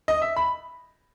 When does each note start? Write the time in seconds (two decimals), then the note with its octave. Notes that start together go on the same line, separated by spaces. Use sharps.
0.08 D#5
0.22 E5
0.36 B5